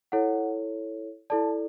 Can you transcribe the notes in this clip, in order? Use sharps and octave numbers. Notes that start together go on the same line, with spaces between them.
E4 A4 C#5 F#5
E4 A4 D5 A5